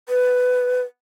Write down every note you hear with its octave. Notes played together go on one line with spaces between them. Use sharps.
B4